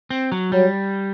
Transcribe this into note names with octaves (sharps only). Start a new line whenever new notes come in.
C4
F#3
F#3 G3